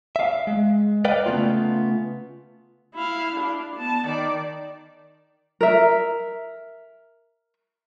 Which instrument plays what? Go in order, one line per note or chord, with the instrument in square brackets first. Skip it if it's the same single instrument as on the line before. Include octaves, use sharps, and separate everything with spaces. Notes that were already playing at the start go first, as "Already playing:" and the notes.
[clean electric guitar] E5 F5
G#3
A#4 B4 D5 D#5 F5 G5
C#3 A3 B3 F4
[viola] E4 F5
D4 E4
B3 A5
D#3 D5
[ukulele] A#4 E5